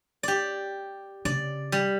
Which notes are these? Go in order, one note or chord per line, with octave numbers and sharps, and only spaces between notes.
G4 D5
C#3 D5
G3